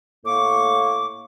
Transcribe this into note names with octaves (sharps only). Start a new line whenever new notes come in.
A2 A#3 C#6 D6